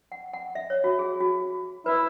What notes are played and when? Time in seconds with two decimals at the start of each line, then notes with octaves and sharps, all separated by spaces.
0.12 F#5
0.33 F#5
0.55 E5
0.70 C#5
0.84 F#4
0.99 G#4
1.20 F#4
1.86 E4 B4